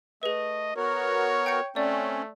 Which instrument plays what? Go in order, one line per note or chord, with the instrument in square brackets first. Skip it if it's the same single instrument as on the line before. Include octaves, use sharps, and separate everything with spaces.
[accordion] A3 [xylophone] G#4 B4 [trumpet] D#5
[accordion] B3 F#4 A#4 [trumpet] C#5
[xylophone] G5 G6 C#7
[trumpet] A3 [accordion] C4 C#4 [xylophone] D5